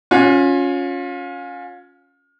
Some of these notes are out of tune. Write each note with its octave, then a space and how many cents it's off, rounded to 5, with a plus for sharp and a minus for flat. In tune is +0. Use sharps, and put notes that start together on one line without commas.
C#4 +0 F4 +30